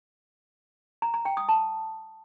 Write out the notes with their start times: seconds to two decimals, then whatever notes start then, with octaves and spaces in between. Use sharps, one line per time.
1.02 A#5
1.14 A#5
1.25 G5
1.37 D#6
1.49 A5